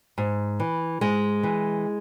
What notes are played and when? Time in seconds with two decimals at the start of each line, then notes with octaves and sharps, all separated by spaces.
0.18 G#2
0.60 E3
1.01 G#2 G#3
1.43 E3